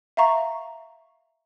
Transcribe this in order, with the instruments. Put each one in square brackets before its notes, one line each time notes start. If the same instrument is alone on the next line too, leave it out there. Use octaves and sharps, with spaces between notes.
[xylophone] E5 F5 A#5 C#6